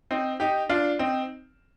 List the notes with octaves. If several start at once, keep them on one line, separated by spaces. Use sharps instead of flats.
C4 D#4
D#4 G4
D4 F4
C4 D#4